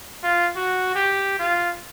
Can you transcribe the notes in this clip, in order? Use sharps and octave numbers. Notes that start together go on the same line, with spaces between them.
F4
F#4
G4
F4